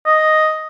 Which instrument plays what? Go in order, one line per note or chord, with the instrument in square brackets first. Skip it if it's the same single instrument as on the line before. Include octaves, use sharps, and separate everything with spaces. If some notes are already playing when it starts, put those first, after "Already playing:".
[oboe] D#5